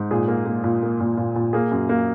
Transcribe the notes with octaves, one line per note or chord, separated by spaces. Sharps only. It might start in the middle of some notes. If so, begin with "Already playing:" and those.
Already playing: G#2
A#2 G#4
A#3
A#3
A#2
A#3
A#2
A#2
A#2
A#3 G#4
F#2
A#3